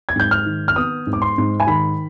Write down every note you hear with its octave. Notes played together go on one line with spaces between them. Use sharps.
G#6
G#2 G6
F6
D#3
F6
B3 D#6
G#2
D6
C6
G#2
G#5
D#3 B5